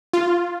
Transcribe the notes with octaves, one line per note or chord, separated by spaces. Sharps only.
F4